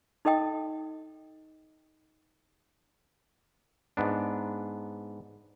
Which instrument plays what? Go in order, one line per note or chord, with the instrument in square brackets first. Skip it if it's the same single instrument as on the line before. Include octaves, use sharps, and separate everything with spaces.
[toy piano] D#4 A4 D#5 G5 D#6
[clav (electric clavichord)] G#2 B3 D4